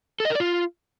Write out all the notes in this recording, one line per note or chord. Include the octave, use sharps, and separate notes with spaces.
A4
D#5
A#4
D5
F4